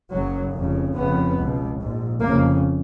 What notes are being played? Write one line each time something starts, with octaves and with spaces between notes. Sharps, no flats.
F#1 F#2 C#3 F#3
F1 F2 C#3
F1 F2 C#3 B3
C#2 B2
A#1 G#2
F1 F2 C#3 A#3